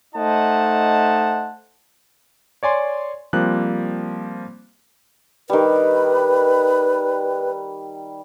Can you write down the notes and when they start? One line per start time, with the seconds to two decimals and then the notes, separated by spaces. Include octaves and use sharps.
0.15 A3 D#4 C5 D#5 F#5 A5
2.63 C#5 D5 G#5 C6
3.33 F3 G3 A#3 C4 F#6
5.50 D#3 G3 B4